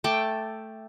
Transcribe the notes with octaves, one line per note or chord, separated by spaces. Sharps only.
A3 G5 A5 D6